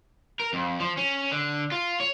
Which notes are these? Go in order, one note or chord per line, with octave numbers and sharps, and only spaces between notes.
A#4
F2
F3
C#4
D3
F4
C#5